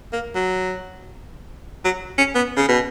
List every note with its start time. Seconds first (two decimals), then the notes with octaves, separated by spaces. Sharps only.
0.13 A#3
0.35 F#3
1.85 F#3
2.18 C#4
2.35 B3
2.57 C#3
2.68 B2